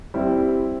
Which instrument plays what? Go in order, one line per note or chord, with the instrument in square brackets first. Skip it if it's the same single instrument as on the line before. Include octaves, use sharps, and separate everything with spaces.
[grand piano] G3 [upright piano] C4 E4